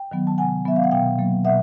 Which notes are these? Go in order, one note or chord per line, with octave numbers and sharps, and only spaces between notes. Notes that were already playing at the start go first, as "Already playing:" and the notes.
Already playing: G5
D#3 F#3 B3
A5
C3 F#5 G#5
D#3 F#3 B3 E5
F5
F#5
B2 F5 G5
F#3 A#3
B2 E5 F#5